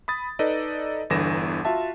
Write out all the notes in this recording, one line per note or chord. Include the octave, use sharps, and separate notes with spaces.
B5 D#6 A6
D#4 A4 B4 D5 D#5
G1 E2 D3 E3 A#6 E7
F4 F#4 E5 A5